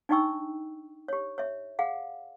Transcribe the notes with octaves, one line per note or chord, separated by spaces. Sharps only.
D4 D#4 D5 G5 C#6 E6
G4 C#5
C#5 E5
G#4 F5 F#5